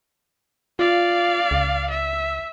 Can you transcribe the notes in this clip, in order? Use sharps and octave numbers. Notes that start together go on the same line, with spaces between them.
F4 D5 F5
C#2
E5